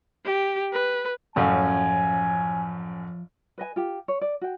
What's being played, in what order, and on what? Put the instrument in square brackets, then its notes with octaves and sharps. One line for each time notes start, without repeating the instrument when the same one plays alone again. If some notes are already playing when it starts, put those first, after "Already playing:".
[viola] G4
B4
[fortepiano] A1 F#2 C#4 [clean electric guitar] F3 F5 [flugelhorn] G#5
[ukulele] B4 D#5 G#5
F4 G4
C#5
D5
F#4 G5